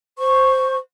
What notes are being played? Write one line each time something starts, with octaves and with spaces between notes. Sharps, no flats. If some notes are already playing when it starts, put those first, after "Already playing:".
C5 C#6